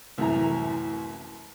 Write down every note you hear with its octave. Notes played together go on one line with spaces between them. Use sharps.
C2 F#2 A2 E3 A#5